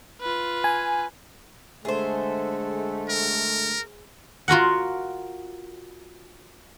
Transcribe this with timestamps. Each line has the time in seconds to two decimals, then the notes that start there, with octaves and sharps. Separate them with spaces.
0.21 F4 B4
0.64 G#5
1.85 D3 G#3 A3 G#4 C5
3.10 A#4
4.48 F4 F#4 A#4 F#5